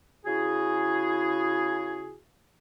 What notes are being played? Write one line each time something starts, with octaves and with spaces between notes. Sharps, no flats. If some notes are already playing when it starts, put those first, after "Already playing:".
C#3 E4 F#4 G#4